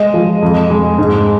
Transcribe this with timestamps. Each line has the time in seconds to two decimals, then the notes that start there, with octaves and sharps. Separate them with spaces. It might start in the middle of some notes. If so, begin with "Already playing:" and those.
Already playing: G#3 D#5
0.14 F3
0.42 F2
0.70 G#3
0.98 G#2